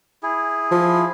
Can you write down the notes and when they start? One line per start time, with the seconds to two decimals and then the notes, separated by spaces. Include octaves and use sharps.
0.23 E4 G#4
0.71 F3